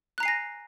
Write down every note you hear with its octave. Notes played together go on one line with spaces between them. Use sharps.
G#5 A#5 F#6 A#6 C7